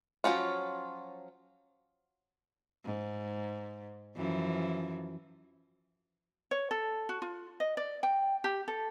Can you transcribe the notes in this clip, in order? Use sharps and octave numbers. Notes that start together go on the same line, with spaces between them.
F3 F#3 C#4 F4
G#2
F#2 E3 F3
C#5
A4
F#4
F4
D#5
D5
G5
G4
A4